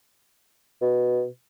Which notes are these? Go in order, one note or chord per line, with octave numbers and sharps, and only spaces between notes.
B2